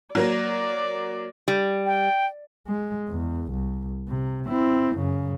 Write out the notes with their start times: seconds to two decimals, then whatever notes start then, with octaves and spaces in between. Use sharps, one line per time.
0.15 F#3 A#3 A#4 D5
1.48 G3
1.86 G5
2.67 G#3
3.09 E2
3.51 C2
4.08 C3
4.47 C4 E4
4.96 F#2 C#3